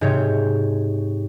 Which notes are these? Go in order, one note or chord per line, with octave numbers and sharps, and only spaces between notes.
G#2 C3 C#5 G6